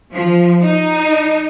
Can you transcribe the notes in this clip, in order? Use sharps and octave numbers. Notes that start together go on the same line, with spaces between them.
F3
D#4